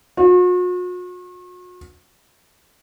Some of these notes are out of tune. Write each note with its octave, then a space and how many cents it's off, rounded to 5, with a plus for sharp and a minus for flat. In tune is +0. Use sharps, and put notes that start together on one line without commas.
F#4 -45